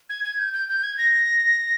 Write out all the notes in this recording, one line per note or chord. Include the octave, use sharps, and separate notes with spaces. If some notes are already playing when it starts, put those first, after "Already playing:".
G#6
G#6
G6
G6
G6
G#6
A#6